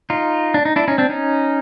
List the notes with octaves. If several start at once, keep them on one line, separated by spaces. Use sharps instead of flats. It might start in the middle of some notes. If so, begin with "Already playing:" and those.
D#4 F4
D4
D#4
D4 E4
C#4 D#4
C4 D4
C#4 D#4